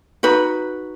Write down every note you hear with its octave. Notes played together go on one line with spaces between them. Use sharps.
D#4 F#4 B4